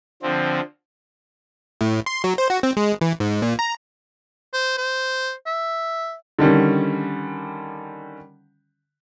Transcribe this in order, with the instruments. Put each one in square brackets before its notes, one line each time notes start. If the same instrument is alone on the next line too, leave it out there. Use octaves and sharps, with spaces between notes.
[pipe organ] D3 F3 C4
[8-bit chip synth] A2
C6
F#3
C5
F#4
C4
G#3
E3
G#2
A#2
A#5
[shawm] C5
C5
E5
[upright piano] D3 D#3 G3 C#4